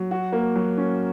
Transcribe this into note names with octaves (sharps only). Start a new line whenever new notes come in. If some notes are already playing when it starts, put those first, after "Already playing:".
Already playing: F#3
F#4
A#3
F#3
C#4